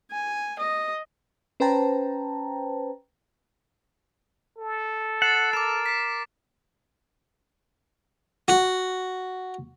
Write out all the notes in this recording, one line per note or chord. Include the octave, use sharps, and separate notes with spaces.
G#5
D#5
C#4 B4 C5 G5 A5 A#5
A4
F#5 A6 C7 E7
A#4 D6 E7
B6 C7
F#4